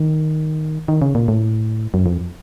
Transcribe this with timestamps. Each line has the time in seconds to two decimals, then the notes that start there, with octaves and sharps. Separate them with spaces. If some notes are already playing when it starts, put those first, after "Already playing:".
Already playing: D#3
0.88 D#3
1.02 C#3
1.15 A#2
1.28 A2
1.94 F#2
2.06 F2